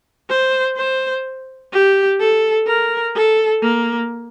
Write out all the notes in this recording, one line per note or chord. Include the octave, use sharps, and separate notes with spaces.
C5
C5
G4
A4
A#4
A4
A#3